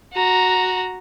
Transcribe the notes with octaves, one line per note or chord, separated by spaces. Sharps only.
F#4 A#5